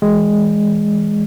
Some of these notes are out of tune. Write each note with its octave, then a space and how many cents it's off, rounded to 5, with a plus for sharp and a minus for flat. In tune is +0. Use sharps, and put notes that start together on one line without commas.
E3 +0 G#3 +0